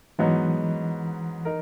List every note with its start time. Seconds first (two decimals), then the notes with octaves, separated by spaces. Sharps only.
0.19 G#2 E3 F#3 B3 D#4
1.45 D#4 A#4